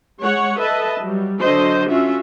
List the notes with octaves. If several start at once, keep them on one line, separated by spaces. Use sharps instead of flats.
G#3 C#5 F#5
A4 B4 D#5 E5 A5
F#3 G3
D3 F#3 F#4 C5 D#5
C#4 F4 F#4 E5